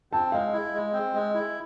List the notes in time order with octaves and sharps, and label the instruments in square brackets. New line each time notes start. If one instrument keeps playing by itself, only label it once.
[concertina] C4 [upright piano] A5
[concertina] G#3 [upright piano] F5
[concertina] E4
G#3
C4
G#3
E4